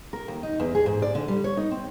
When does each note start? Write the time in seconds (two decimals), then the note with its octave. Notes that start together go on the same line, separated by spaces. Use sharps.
0.13 A#4
0.28 D#2
0.43 D#4
0.60 E2
0.75 G#4
0.86 G#2
1.02 D5
1.15 D3
1.28 G3
1.44 C#5
1.57 D#4
1.71 C4